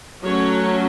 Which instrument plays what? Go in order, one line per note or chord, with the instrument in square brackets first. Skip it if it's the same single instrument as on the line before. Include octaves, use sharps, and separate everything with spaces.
[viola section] F#3 A3 C#4 C#5